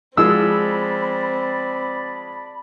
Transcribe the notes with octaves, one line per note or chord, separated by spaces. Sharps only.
F3 G#3 C4 D5 A5 B5 E6